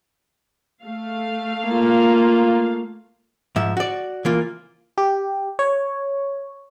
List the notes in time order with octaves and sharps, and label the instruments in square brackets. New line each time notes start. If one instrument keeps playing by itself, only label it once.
[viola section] A3 F5
[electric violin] A#3 F4
[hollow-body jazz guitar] G#2 F3 E5
F#4 D5
E3 A#3 F4
[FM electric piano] G4
C#5